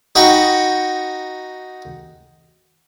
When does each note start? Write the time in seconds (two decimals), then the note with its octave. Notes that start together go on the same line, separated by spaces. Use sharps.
0.15 D#4 F#4 F#5 G5 B5 C#6